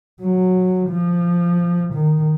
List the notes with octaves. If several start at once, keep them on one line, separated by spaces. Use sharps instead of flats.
F#3
F3
D#3